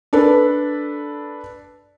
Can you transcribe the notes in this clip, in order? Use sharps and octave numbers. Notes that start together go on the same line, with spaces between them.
D4 A4 B4